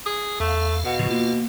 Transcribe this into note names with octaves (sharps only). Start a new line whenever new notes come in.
G#4
E2 A3 F5
B2 F5 F#5
A2 C#3 F3 F#4
A#3 F4